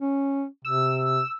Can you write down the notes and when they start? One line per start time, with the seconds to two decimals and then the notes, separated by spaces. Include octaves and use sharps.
0.01 C#4
0.65 C3 E6